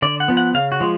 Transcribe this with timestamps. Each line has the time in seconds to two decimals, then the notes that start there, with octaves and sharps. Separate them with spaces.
0.02 D3 D5
0.20 F#5
0.28 F3 B3
0.37 F#5
0.54 C#3 F5
0.72 F#4
0.80 F3 G#3